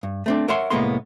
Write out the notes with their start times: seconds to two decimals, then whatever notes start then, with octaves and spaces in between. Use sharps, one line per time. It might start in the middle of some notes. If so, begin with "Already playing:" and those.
0.03 G2
0.26 A3 C4 D4
0.48 A#4 C#5 E5 F#5 C6
0.70 C2 A2 G#3 A#3 B3 C6